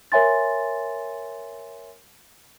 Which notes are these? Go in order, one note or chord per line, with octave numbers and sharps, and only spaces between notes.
A#4 C#5 E5 G#5 C6 A6